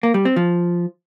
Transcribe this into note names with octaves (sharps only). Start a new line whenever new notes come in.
A#3
G3
C4
F3